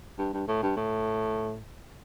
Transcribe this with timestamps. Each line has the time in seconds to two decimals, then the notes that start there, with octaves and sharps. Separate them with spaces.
0.18 G2
0.33 G2
0.48 A2
0.62 G2
0.77 A2